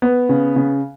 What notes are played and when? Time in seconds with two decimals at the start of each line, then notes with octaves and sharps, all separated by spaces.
0.02 B3
0.29 C#3
0.56 C#3